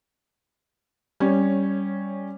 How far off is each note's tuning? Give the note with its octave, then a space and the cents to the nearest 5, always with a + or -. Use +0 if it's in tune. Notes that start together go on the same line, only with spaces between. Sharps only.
G3 +0 C#4 +0 C#5 -15